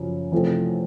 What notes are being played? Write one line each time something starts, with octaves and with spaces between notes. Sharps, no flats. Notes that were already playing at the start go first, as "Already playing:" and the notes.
Already playing: F#2 C#3 F3
E2 C3 F3 A3 C4